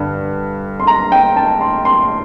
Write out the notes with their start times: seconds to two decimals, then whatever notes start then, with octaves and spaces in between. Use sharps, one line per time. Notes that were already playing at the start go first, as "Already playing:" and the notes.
Already playing: G2 D3
0.80 C6
0.87 A#5
1.12 G5
1.36 A5
1.61 C6
1.85 C6